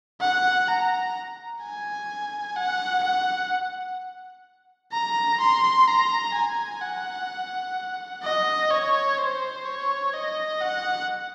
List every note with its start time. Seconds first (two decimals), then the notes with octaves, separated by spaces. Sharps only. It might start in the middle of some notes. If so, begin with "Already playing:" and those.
0.21 F#5
0.68 A#5
1.62 G#5
2.56 F#5
3.03 F#5
4.92 A#5
5.40 C6
5.87 A#5
6.34 G#5
6.81 F#5
8.23 D#5
8.71 C#5
9.18 C5
9.65 C#5
10.13 D#5
10.61 F#5